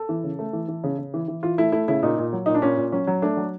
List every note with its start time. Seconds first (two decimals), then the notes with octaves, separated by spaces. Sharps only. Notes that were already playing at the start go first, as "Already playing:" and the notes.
Already playing: A4
0.09 E3
0.24 C#3
0.39 A3
0.53 E3
0.68 E3
0.84 C#3
0.99 C#3
1.14 E3
1.28 E3
1.43 E3 F4
1.58 A3 E4
1.72 A3 E4
1.88 C#3 E4
2.03 A#2 D#4
2.18 A#2
2.33 F#3
2.46 A#2 D#4
2.54 D4
2.62 A#2 C#4
2.77 A#2
2.92 F#3 C#4
3.07 F#3
3.22 A3 D4
3.37 F#3